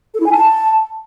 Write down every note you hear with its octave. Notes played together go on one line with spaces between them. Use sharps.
A4
E4
G#5
A5